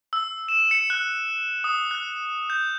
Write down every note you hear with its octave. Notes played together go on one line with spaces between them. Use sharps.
E6
E7
C#7
F#6
D#6
F#6
G6